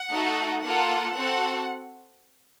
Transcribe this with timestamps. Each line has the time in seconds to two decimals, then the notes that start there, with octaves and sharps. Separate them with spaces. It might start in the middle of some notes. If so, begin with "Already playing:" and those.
Already playing: F#5
0.12 A3 D#4 F#4 A4
0.63 A#3 F4 A4 F#5
1.15 C4 F#4 A4 F#5